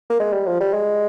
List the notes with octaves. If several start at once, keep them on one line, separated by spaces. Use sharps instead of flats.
A#3
G#3
G3
F3
G3
G#3